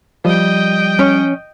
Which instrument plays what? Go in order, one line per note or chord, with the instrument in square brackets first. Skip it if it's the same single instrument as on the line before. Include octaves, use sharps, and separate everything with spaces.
[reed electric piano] F3 [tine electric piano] G3 [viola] D#5 G5
[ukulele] C#4